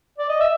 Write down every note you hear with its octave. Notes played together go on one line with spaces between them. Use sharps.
D5
D#5
E5